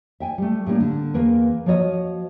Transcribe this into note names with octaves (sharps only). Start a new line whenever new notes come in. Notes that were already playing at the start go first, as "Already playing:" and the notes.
E5 G5 G#5
G3 A3
A2 G3 A#3 D4
D3
E2 A#3 A#4 B4
F3 F#4 C#5 D#5